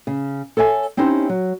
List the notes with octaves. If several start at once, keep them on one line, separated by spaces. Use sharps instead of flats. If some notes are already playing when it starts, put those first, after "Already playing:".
C#3
A4 C#5 E5 G#5
C4 C#4 D#4 E4 G4 C5
F#3